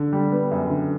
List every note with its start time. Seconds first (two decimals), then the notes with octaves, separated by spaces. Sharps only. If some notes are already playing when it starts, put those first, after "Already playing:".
Already playing: D3
0.13 G3
0.32 B3
0.51 F#2
0.70 D3